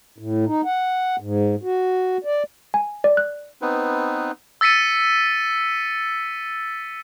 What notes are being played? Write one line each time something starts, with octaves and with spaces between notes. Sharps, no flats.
A2
D#4
F#5
G#2
F#4
D5
G#5
D5
F#6
B3 C4 D#4 B4
E6 A6 B6 C#7 D#7